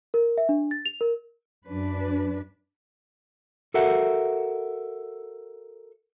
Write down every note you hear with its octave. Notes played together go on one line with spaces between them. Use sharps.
A#4
E5
D4
A6
F7
A#4
F#2 D4 B4
F#4 A4 A#4 E5 F#5